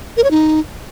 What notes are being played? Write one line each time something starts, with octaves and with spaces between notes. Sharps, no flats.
A#4
C#5
D#4